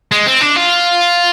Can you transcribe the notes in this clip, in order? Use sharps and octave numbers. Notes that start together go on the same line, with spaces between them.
G#3
C4
D4
F4